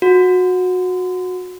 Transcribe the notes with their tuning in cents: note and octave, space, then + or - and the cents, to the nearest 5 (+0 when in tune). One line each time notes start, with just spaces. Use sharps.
F#4 -20